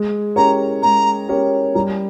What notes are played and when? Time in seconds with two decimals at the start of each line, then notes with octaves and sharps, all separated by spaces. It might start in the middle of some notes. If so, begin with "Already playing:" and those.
Already playing: G#3
0.36 C#4 G4 A#4 C#5 A#5
0.83 G#3 A#5
1.29 C#4 G4 A#4 C#5
1.75 G3 A#5